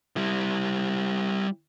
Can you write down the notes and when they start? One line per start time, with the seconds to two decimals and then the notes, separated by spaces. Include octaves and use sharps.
0.17 G3 E4